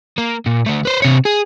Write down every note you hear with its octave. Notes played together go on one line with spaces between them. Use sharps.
A#3
A#2
D3 A3
B4 C5
C3 C#5
G#4